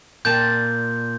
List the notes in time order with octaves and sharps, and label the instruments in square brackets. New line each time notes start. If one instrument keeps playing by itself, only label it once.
[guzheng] A#2 D5 A5 [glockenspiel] G6